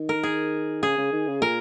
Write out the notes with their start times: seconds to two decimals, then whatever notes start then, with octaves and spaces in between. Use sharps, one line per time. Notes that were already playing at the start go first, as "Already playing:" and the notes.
Already playing: D#3
0.09 A#4
0.23 G#4
0.83 C#3 G#4
0.98 C#3
1.12 D#3
1.27 C#3
1.42 A#2 A#4